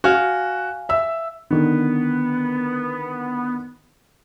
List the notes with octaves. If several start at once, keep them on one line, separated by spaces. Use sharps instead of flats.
F#4 F5 G#5
E5 E6
D3 D#3 B3